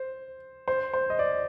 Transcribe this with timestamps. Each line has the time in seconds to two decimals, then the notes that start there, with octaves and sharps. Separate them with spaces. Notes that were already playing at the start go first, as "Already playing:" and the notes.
Already playing: C5
0.68 C5
0.93 C5
1.10 D#5
1.19 D5